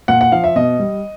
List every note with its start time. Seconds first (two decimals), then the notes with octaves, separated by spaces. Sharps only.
0.08 A#2 F#5
0.21 F#5
0.32 F3 F5
0.44 E5
0.56 B2 D#5
0.79 G3